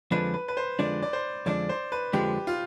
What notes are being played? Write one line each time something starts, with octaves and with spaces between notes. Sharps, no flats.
F2 D3 F3 G#3 D4 B4
B4
B4
C5
F2 D3 F3 G#3 D4 D5
D5
C5
F2 D3 F3 G#3 D4 D5
C5
B4
F2 D3 F3 G#3 D4 G4
F4